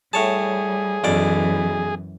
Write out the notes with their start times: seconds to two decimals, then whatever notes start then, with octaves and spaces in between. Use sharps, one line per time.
0.13 A2 G3 G#4 C#5 A5
1.04 B1 F#2 B2 E3 D5